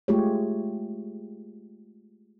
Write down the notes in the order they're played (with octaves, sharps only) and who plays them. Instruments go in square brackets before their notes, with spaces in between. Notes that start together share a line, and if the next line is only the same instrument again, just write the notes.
[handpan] G#3 A3 F4 G4 G#4 C#5